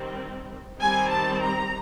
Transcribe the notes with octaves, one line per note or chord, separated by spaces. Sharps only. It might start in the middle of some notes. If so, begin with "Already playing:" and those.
Already playing: D#3 G3 C4
D#3 G3 C4 G#5
A5
A#5